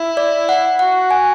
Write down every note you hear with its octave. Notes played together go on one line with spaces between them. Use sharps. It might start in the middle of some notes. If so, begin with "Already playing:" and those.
Already playing: E4
D5
F#5
F#4 F#5
G#5